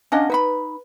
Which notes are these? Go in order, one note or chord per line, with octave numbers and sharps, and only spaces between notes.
C#4 D4 D#5 F5 F#5 G#5
D#4 B4 E5 B5